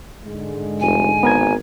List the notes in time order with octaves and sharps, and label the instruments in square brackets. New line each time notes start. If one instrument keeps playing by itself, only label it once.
[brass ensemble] G#2 D3 G#3
[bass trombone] F1 [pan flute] G#5
[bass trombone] G#1 [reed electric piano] B3 A#4 G#6